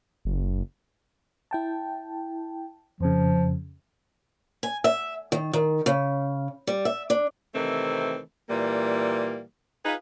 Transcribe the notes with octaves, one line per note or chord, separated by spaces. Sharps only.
F#1
E4 G5 A5
F2 C#3 F3
G#5
E5
D#3
D#3
C#3
G3
E5
D4
C3 D#3 E3 A3 C4
A#2 E3 G3 A#3
D#4 F4 G#4 B4